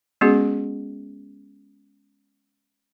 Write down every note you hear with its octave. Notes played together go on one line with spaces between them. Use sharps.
G#3 B3 C#4 F#4 G#4